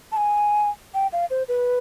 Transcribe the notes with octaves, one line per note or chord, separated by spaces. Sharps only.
A5
G#5
G5
F5
C5
B4